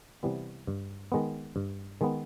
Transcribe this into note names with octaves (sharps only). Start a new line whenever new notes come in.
C3 E3 G3 B3
G2
D#3 G#3 B3
G2
D#3 G#3 B3